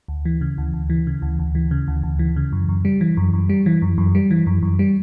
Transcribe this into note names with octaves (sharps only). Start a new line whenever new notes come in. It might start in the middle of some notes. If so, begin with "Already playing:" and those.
D2
E3
C#3
D2
D2
E3
C#3
D2
D2
E3
C#3
D2
D2
E3
C#3
F#2
F#2
G3
E3
F#2
F#2
G3
E3
F#2
F#2
G3
E3
F#2
F#2
G3